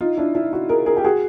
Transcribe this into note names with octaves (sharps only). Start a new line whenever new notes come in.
D#4 F4
D4 E4
D4 E4
E4 F#4
G#4 A#4
G#4 A#4
G4
F#4 G#4